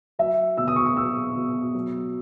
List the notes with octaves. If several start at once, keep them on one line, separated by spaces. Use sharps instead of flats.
F#3 E5
B2 E6
D#6
C#6
D#6
F#3 E6
B2
F#3